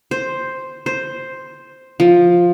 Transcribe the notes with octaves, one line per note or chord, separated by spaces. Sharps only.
C5
C5
F3